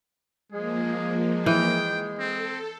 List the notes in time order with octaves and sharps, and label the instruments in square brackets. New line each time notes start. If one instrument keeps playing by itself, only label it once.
[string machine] F3 A#3 [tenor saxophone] G#3 [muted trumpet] G#4
[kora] E3 [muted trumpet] G5
[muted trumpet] C4 [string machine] A4